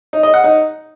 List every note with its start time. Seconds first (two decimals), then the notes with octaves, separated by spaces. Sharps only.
0.13 D#4
0.23 D#5
0.34 F#5
0.44 D#4